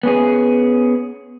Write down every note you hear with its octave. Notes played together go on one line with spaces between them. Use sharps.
B3 C#4 G#4